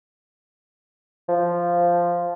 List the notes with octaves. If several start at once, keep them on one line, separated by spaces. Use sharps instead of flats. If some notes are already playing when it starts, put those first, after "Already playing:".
F3